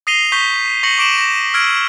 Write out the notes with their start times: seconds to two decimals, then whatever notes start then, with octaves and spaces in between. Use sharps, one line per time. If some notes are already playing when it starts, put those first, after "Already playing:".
0.07 D#6 A#6 C7 D#7 F7 G7
0.32 C#6 G6 B6 G7
0.83 C#6 A#6 C#7 F#7
0.98 C#6 D6 D7 E7 F#7
1.16 A#6 E7
1.54 E6 F6 G#6 D7